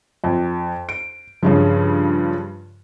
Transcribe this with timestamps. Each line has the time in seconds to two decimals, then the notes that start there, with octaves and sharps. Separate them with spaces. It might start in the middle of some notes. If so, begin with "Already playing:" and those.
0.24 F2
0.89 D7
1.43 G2 C#3 F3